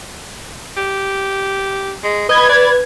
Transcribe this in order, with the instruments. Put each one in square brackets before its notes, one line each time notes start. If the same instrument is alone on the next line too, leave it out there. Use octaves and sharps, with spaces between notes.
[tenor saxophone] G4
G#3
[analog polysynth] B4 G#6 [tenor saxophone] D#5
[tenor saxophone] D5